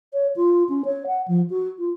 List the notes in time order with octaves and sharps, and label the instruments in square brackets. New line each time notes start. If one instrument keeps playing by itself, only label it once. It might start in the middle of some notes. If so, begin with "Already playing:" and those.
[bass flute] C#5
F4
C#4
C#5
F#5
F3
F#4
F4